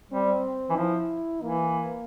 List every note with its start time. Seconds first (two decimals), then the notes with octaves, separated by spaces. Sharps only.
0.12 G3 C4
0.70 E3
0.76 F3 E4
1.42 E3 A#3